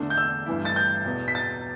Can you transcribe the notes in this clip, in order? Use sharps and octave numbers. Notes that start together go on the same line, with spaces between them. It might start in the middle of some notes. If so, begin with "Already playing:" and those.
Already playing: E2 D3 A3 D4
G6
E6
G2 E3 A3 E4
A6
G6
E2 B2 B3
B6
A6